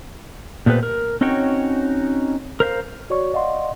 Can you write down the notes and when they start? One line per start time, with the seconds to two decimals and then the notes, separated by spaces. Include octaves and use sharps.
0.66 A#2 A3 B3 G4 B4 C5
0.83 A#4
1.21 C4 C#4 D#4 F#4 C#5 G5
2.60 A#4 C5 E5 F5
3.10 F#4 C#5 D5 C#6
3.34 D5 D#5 F5 F#5 C6